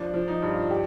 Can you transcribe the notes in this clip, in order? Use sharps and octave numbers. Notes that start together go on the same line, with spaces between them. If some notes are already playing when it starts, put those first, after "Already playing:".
Already playing: F3 D4
F3
D#4
G2
F4
G4